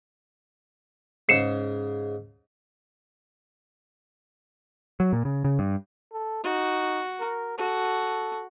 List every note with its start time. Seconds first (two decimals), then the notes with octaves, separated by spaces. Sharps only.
1.29 G#2 C#3 C7 C#7 E7
5.00 F#3
5.13 A#2
5.25 C#3
5.44 C#3
5.59 G2
6.12 A4
6.44 D#4 F#4
7.20 A#4
7.58 F#4 A4